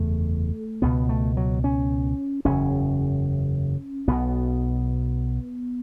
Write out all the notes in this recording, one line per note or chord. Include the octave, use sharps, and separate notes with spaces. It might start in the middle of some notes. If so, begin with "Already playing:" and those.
Already playing: F#1 E2 C#3 A3
C#2 B2 B3
A3
F#3
C#4
F#1 E2 C#3 C#4
B1 B2 B3